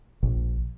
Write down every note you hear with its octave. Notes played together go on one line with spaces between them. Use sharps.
A#1